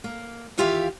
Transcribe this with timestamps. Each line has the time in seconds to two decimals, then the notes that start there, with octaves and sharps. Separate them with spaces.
0.04 A#3
0.58 D#2 E3 F4 G4 E5 F5